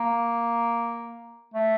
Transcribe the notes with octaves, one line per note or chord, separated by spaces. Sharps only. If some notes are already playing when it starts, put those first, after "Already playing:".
Already playing: A#3
A3